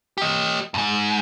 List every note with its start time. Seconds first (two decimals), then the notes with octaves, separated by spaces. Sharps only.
0.18 G4 D#5
0.74 F2 G#2